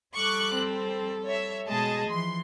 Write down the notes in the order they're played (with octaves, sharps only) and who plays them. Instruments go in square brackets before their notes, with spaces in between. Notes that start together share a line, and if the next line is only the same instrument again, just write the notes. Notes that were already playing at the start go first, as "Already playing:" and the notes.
[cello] G3 A4 [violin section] C#6 D6 F#6
[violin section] C4
C#5 E5
[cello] B2 G#3 [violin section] G#4 D#5 A5
[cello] E3 F3 [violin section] C6